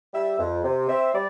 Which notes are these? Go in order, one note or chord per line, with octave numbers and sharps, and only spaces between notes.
G3 E5
F2
C3
C4 E5
G3 D5